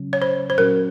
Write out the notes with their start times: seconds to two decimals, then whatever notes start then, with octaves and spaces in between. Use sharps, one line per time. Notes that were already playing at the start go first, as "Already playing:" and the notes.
Already playing: C#3 F#3 C#4
0.13 C#5
0.22 C5
0.50 C5
0.58 A#2 F#3 C#4 F#4 A#4